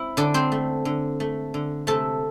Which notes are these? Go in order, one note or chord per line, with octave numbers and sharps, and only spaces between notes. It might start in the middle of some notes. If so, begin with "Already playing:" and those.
Already playing: C4 E4
D3 D4 D5
C4 C5
A3
D3
A3
D3
C3 A3 A4